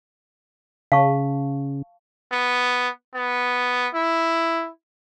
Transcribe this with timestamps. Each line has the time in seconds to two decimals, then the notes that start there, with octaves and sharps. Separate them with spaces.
0.92 C#3 F5 A5 C#6
2.32 B3
3.15 B3
3.95 E4